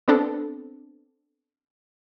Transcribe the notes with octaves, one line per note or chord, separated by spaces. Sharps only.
B3 C4 D4 A4